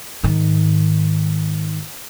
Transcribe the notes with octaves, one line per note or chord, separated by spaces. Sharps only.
G#2 D#3